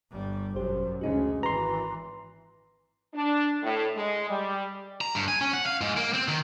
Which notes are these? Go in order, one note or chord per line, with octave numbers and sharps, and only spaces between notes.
G1 G3
G#1 F#2 B2 G4 C5
D2 C#3 G#3 C#4 D#4 F#4
G#1 E3 F#4 B4 A#5 C6
D4
A2
G#3
G3
A#5
G2
G#5
C#4
F#5
F5
G#2
A#3
C4
D#3